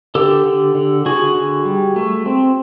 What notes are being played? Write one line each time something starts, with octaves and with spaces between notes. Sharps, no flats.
D3 G4 A4
D3
D3
D3 F#4 G#4
D3
G3
A3
C4